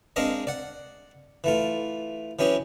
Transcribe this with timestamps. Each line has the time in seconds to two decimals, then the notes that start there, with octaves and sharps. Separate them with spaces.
0.16 G#3 C4 D4 A#4 D#5 F5
0.47 D5 F#5
1.44 E3 A3 F4
2.39 E3 F#3 C#4 G4 G#4